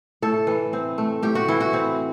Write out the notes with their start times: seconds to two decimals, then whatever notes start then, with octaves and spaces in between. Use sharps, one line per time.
0.22 A2 A4
0.47 E3
0.73 C4
0.98 A3
1.23 A2 G4
1.35 F#4
1.48 E3 E4
1.60 F#4
1.73 C4